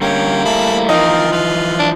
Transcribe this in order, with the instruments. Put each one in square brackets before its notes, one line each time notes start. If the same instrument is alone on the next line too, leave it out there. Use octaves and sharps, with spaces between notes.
[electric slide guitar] D3 G3 C#4 [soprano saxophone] A#3 [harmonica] C#5 G5
[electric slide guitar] G3 A3 E4 [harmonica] G#4 A5 B5
[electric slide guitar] E3 F3 [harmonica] C4 F4 A#4 [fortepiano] D#4
[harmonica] F4 B4
[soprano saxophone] D4